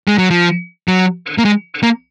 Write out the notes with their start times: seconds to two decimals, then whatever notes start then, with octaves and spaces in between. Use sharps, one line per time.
0.08 G#3
0.18 F#3
0.31 F3
0.88 F#3
1.38 A#3
1.45 G#3
1.83 A#3